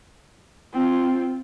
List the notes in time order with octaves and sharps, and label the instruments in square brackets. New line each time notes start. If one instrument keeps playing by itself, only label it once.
[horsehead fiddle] C4 F4